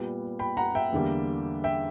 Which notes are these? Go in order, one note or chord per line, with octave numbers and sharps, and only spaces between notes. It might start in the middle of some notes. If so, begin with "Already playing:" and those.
Already playing: A#2 G3 B3
G5 B5
F#5 A#5
E5 G5
E2 D3 G3 A#3
E5 G5